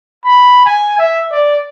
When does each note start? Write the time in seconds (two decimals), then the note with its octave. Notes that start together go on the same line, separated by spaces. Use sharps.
0.24 B5
0.66 G#5
0.99 E5
1.31 D5